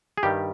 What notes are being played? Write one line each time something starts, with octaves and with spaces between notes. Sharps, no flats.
G#4
G2 D#3 G3 G4